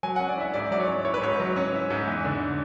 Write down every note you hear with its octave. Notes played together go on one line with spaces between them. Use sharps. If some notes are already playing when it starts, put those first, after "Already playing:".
F#3 G#5
C#4 F#5
D5
E4 E5
G#2 D5
F#3 D5
C#5
C#4
E4 C#5
B4
G#2 C#5
F#3
C#4
E4
G#2
E2
D3